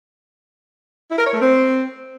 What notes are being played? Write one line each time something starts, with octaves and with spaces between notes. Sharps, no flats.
E4
A#4
C#5
A3
C4